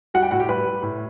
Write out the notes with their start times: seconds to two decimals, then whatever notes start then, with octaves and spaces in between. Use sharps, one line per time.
0.14 G3 F#4 F#5
0.22 G4 G5
0.31 A2 F#4 F#5
0.40 G4 G5
0.49 G3 B4 B5
0.66 G3
0.83 A2